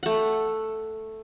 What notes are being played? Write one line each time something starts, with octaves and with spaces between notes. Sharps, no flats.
A3 F#5